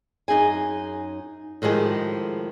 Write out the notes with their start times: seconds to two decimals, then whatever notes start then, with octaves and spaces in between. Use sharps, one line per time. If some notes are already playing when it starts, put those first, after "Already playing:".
0.28 F#2 D#4 G#4 G#5
1.62 A2 D#3 F3 G#3 G4